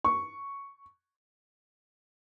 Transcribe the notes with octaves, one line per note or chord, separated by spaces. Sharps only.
C#6